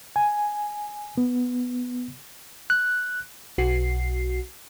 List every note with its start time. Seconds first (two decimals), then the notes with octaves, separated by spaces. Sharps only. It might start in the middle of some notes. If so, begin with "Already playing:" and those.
0.16 G#5
1.18 B3
2.70 F#6
3.58 B1 F#4 C7